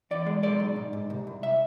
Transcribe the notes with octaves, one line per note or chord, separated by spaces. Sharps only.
E2 D5
G#3
B1 D5
B1
G#2
G#2
C2
C2
E5